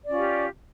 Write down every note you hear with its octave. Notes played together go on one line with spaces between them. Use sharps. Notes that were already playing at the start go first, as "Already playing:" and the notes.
C#4 F4 G4 D5